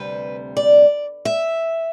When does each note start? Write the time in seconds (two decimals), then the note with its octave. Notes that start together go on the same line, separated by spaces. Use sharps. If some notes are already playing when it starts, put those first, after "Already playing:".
Already playing: D2 C3 G3 B4
0.57 D5
1.25 E5